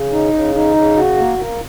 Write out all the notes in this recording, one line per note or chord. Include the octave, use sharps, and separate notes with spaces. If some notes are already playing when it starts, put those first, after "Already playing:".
Already playing: C#3
D#4
C#3
D#4
C#3
F#4
A#3
A#3